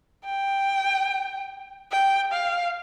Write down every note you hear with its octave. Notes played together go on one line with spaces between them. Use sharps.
G5
G5
F5